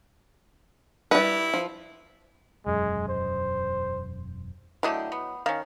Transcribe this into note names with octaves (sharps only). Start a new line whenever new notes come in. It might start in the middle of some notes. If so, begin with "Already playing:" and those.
G3 E4 B4
F3
E1 F#2 G#3
C5
D3 F#3 A3 E4 G4 D#5
B3
D#3 C#4 F5